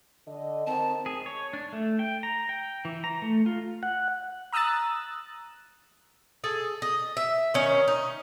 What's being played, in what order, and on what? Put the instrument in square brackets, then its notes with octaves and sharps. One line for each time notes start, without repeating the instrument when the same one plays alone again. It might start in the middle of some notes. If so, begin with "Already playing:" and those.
[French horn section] D3 D#5
[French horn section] D#3 C4 [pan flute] A5
[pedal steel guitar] G#4
C#5
D4
A3
G5
A#5
G5
E3
A#5
A3
F4
[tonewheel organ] F#5
[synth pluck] A#5 D#6 E6 F#6 A6
[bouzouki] G#4 A4
D#5
E5
D#3 C#4
D#4